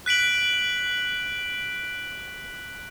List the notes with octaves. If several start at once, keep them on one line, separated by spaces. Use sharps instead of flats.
F#6 B6 D7 F#7